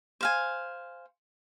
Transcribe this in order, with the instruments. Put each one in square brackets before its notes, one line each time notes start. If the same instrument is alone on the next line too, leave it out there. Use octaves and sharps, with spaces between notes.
[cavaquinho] C5 F5 G#5